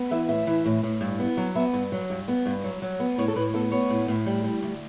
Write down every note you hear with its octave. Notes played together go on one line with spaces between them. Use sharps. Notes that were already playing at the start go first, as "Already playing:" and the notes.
Already playing: B3
E3 E5
A2 E5
E3
A2
A2
G2
B3
F#3
B3 E5
G2
F#3
G2
B3
G2
F#3
F#3
B3
A2 C#5
A4
A2 B4
B3 A4
B3 C#5
A2
A2
G3
G3
D2